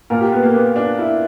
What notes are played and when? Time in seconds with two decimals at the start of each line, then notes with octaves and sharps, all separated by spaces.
0.10 A#2 A#4
0.21 G4
0.32 B3
0.42 A#3
0.54 B3
0.76 D4
0.99 E4